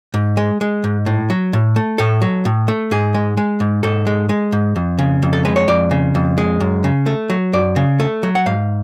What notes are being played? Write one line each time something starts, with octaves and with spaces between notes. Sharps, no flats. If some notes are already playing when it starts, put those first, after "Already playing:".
G#2
G#3
G#3
G#2
A2
F#3
A2
A3
A2 A4
F#3
A2
A3
G#2 G#4
G#3
G#3
G#2
G#2 A4
G#3
G#3
G#2
F2
C#3
F2
A4
G#3 B4
C#5
F2 D5
C#3
F2
G#3
F#2
C#3
A3
F#3
F#2 D5
C#3
A3
F#3
F#5
G#2 F5